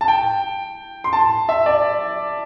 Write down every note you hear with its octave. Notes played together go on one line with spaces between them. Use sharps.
A5
G5
C6
A5
E5
D5